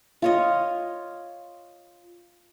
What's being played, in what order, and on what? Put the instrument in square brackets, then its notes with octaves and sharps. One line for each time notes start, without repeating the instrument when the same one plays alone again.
[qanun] F4 C#5 D#5